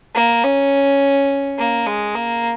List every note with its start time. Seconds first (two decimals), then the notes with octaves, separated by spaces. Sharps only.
0.15 A#3
0.44 C#4
1.59 A#3
1.86 G#3
2.15 A#3